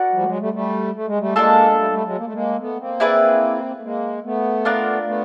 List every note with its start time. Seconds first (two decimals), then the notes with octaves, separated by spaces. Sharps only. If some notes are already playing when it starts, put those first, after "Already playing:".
Already playing: F#4 A#4 D5 F#5
0.12 F3 G3
0.21 A3
0.26 F#3 G#3
0.40 G3 A3
0.53 G3 A3
0.94 A3
1.07 G#3
1.18 G3 A3
1.36 G#3 A#3 D4 F4 A4
1.71 A#3
1.77 G3 A3
1.91 G3 A3
2.04 F#3 G#3
2.18 A#3
2.26 A3
2.33 G#3 A#3
2.59 A3 B3
2.79 A#3 C4
3.00 E4 G#4 B4 D5
3.77 A3
3.82 G#3 A#3
4.24 A3 B3
4.65 D4 F4 A#4 D5
5.06 A3 B3